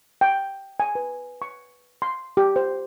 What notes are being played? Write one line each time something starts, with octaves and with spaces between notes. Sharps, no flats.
G5
G#5
B4
C#6
C6
G4
C5